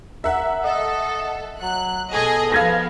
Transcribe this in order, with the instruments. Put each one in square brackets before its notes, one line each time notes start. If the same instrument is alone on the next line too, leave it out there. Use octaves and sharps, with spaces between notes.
[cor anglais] A#4 [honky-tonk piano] E5 F#5
[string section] A4 [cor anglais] D#5
[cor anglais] F#3 [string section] F#6
[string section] B2 G#4 D#5 [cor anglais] A4
[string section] F3 B3 [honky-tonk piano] F5 G#6 A#6